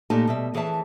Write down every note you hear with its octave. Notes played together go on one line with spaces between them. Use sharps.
A#2 A3 D#4 G4 G#5 A5
B2 G3 E5
F2 E3 G#4 C#5 E5 A5